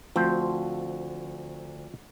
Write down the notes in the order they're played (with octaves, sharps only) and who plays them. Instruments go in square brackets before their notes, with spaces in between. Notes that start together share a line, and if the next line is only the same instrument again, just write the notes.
[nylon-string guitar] D2 [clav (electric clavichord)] F3 C4 C5